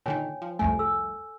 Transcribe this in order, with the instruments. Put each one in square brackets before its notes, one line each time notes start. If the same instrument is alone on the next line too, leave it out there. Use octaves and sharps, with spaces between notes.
[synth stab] A#2 D3 D#3 [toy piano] C#5 G5 G#5
[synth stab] F3
[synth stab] C2 F2 A3 [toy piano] G#5
[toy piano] A4 E6